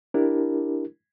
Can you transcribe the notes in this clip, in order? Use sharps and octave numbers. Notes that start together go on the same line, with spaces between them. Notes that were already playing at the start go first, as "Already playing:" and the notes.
D4 E4 G4 A#4